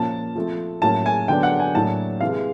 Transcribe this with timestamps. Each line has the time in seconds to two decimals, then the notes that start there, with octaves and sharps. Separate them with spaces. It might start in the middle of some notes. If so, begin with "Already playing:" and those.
Already playing: A#2 F3 A#3 C#4 A5
0.35 F3 A3 C4
0.82 A2 F#3 A#3 C#4 A5
1.06 G#5
1.28 D3 F#3 B3 D4 G5
1.43 F#5
1.60 G#5
1.75 A2 F#3 A#3 D4 A5
2.21 C3 E3 G#3 F5